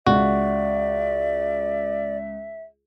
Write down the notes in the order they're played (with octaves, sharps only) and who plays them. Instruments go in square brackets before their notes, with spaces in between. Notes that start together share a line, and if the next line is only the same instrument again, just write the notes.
[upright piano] C#2 [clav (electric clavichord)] F#4 [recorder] D5 [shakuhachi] E5